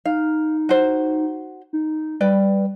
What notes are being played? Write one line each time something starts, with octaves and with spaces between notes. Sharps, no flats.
D#4 F5
F#4 C5
D#4
G3 B4 D5 G5